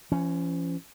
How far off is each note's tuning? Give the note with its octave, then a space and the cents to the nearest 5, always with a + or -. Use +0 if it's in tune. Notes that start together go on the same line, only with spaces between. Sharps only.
F3 -45 C#4 +0